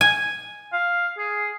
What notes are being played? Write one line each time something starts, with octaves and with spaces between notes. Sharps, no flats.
G#5
F5
G#4